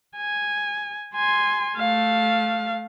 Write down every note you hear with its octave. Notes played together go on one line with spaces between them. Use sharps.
G#5
G#5 C6
A3 F5